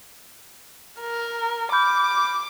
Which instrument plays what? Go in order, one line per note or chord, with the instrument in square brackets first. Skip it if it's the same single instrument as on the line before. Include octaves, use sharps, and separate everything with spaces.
[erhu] A#4
[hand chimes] B5 F6 G6 [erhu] D6